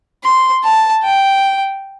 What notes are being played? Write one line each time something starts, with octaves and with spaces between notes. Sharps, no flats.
C6
A5
G5